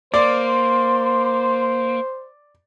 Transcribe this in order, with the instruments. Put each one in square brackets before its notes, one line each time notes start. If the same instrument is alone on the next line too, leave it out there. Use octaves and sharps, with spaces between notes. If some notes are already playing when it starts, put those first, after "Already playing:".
[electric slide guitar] A#3 [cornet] C5 [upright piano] D5 [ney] C6